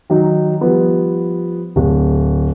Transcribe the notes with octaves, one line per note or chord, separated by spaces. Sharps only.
D#3 F#3 D#4
F3 G3 B3
D1